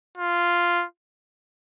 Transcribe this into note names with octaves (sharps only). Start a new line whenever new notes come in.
F4